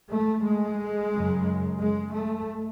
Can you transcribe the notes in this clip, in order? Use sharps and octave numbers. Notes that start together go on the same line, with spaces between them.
A3
G#3
F#2 C#3
G#3
A3